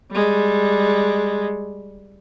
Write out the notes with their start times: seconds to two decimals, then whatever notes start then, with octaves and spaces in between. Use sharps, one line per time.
0.11 G3 G#3